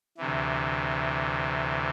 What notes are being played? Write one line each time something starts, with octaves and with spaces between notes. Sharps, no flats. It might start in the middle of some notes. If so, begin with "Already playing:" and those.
D2 C3 E3